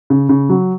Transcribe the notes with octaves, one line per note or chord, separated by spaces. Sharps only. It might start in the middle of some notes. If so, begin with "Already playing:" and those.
C#3
C#3
F#3